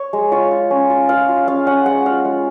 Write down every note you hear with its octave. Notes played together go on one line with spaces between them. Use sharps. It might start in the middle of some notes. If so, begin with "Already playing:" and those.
Already playing: C#5
G#3
F4 C#5
F4
C#4
F4
F4 F5
F4
C#4 F5
C#4 F#5
G#3 F#5
F4 F5
G#3